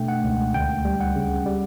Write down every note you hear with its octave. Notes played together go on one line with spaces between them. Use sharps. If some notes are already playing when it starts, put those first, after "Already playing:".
Already playing: B2 A3 D4 G5
F#5
C#2
D2 G5
G3
F#5
C#3
G3